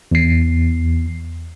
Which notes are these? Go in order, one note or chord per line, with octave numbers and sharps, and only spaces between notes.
E2 C7